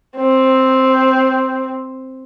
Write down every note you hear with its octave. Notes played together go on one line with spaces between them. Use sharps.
C4